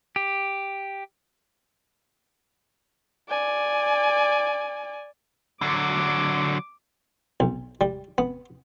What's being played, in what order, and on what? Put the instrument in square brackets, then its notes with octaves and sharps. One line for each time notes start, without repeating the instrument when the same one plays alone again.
[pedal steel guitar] G4
[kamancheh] D5 G#5
[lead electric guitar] D3 F#3 [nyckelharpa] D6
[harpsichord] B1
G3
B3